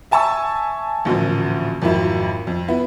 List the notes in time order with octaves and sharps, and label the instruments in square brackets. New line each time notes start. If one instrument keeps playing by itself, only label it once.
[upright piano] E5 G#5 A5 C#6 E6
A1 D2 A#2 F3
G#1 F2 F#3 E4
F2
B3 E4